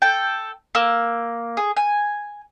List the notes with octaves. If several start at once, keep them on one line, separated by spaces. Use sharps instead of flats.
A4 G5
A#3 E6
G#4
G#5